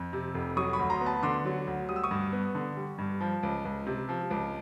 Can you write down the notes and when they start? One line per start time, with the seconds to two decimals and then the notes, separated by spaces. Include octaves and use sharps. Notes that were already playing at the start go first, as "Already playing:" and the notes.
Already playing: F2
0.13 C3
0.34 F1
0.57 F#3 C#6 D#6
0.73 B5 C#6
0.79 D2
0.90 A#5 C6
1.01 B3
1.06 A5 B5
1.23 D3 C6 D6
1.45 F#3
1.67 D2
1.89 G3 D#6
1.96 E6
2.03 C#6 D#6
2.11 G2
2.33 B3
2.55 D3
2.77 G3
2.98 G2
3.20 F3
3.43 C#2
3.65 C#2
3.87 C3
4.09 F3
4.31 C#2